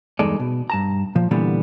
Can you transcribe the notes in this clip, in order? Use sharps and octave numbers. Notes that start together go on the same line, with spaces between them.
E2 G2 G#3 D#4 A4 D5
B2
G2 A5 A#5
A#2 F3
A#2 D3 E3 G3 B3